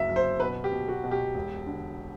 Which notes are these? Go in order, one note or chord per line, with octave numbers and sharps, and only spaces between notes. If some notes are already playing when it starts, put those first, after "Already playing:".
Already playing: F#1 F#3 E5
F#2
C5
B2 B4
G4
B2
F#4
B2
G4
E1
D3